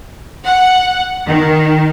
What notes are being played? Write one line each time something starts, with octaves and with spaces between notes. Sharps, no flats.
F#5
D#3